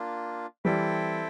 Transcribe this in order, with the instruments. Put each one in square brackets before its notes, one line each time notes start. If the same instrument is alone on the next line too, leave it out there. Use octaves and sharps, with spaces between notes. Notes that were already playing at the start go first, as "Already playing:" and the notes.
Already playing: [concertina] A#3 D4 F4
[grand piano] E3 G3 [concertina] C4 E4 A4 E5 G5